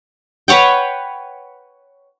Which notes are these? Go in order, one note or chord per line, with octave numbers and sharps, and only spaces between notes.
B4 C#5 F#5 G5